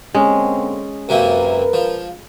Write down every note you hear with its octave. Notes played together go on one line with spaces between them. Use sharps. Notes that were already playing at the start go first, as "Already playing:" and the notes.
D3 G#3 A#3 C4 C#4
F#2 C3 A#3 A#4 B4
F3